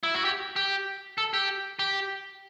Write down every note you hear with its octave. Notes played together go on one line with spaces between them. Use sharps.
E4
F#4
G4
G4
A4
G4
G4